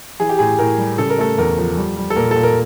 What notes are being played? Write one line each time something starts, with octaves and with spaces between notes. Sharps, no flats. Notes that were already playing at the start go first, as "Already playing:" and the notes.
E3 G#4
G4
A2 G#4
A2 A#4
G3
C#3 A4
A#4
A3 A4
E2 A#4
F3
G3
G3
A4
A#2 A#4
A#2 A4
A#4